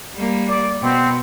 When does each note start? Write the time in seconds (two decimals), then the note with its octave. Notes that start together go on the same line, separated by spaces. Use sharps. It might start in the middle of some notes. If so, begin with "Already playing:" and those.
0.15 G3 A#3
0.48 D5
0.82 B2 B3 C4